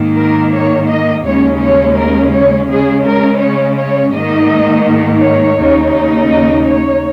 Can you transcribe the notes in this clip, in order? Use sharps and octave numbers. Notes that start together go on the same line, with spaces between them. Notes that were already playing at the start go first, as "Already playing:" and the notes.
Already playing: G#2 D#3 A#3
A#4
C#5
D#5
D#2 C#3 G#3 C#4 C#5
C#5
A#4
C#5
C#3 G#3 C#4 G#4
A#4
C#5
C#5
G#2 D#3 A#3 D#4 D#5
C#5
D#2 C#3 A#3 D#4
D#5
C#5